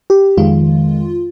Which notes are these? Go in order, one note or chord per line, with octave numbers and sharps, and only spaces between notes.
G4
F2 D#3 G#3 F4